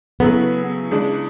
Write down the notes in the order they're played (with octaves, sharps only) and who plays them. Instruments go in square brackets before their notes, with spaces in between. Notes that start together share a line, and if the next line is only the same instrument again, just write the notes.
[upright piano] C#3 F#3 A3 E4 G#4 [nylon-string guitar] B3
[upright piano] C#2 C#3 G#3 D4